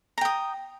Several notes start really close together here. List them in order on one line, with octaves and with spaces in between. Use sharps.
A#5 G5 D#6